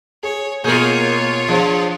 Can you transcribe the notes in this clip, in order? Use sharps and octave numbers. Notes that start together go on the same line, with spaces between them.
G#4 C#5
B2 A#3 F4 G#4 A#4 C#5 G6
F3 D4 G#4 C5